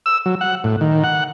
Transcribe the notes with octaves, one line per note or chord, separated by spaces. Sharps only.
E6
F#3
F#5
A2
D#3
F#5